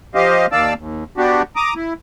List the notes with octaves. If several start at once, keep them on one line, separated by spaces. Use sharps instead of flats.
F3 G4 C5 D#5 F5
D#2 D#3 D5 F5 A5 E6
D#2
B3 D4 F#4 G4
A#5 D6 D#6
E4